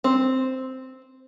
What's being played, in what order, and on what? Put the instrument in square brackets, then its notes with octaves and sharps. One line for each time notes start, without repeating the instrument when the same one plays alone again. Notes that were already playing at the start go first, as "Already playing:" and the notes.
[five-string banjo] C4